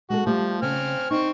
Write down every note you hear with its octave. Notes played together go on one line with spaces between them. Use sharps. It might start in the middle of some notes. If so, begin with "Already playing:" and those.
G#3 F#4 G#4 A4
F3 G3 A3 G4
C#3 C4 G#5 F6
C4 D#4 C#6